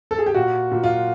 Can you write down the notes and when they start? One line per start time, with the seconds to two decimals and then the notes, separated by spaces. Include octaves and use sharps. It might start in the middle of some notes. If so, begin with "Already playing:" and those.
0.11 A4
0.19 G#4
0.26 G4
0.34 A#2 F#4
0.71 A#2
0.84 F4